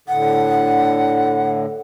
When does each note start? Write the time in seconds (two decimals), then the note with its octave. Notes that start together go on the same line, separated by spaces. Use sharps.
0.08 A2 D3 F#5